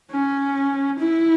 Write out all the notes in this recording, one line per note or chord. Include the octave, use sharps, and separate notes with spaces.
C#4
E4